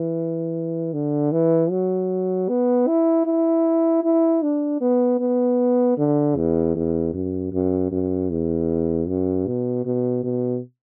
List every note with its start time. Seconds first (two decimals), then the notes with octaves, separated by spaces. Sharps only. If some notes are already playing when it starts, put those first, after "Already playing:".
Already playing: E3
0.93 D3
1.32 E3
1.70 F#3
2.49 B3
2.87 E4
3.25 E4
4.04 E4
4.42 D4
4.81 B3
5.19 B3
5.97 D3
6.36 E2
6.75 E2
7.13 F#2
7.52 F#2
7.91 F#2
8.30 E2
9.08 F#2
9.47 B2
9.85 B2
10.23 B2